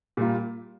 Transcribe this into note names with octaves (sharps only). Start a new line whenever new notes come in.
A#2 G3 A#3 F4